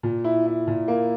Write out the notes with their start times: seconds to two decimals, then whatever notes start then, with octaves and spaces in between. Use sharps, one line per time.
0.03 A#2
0.24 E4
0.46 E4
0.67 A#2
0.88 A#3